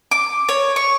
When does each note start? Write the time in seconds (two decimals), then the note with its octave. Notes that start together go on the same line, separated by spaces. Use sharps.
0.11 D6
0.49 C#5
0.76 C#6